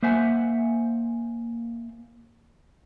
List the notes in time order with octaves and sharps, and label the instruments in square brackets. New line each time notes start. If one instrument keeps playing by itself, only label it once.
[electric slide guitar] A#3 C5 E5 F#5 G#5